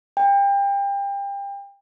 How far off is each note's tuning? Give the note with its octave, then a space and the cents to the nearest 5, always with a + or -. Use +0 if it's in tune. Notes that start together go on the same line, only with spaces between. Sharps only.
G5 +30